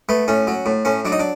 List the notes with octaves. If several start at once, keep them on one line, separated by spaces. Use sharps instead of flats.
A3 B3
A2 C#4
F#3
A2
A2 C#4
F#3 D4
D#4
D4